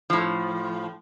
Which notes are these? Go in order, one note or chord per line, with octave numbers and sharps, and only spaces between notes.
A2 F3